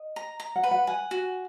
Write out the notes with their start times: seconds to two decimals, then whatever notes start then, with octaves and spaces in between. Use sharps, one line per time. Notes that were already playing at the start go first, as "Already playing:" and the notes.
Already playing: D#5
0.16 A#5
0.40 A#5
0.56 F#5
0.63 B4
0.71 F#5
0.87 F#5 G#5
1.11 F#4